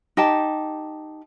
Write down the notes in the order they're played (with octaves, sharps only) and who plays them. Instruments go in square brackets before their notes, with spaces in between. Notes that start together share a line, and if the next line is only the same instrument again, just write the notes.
[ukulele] D#4 G4 G5 A5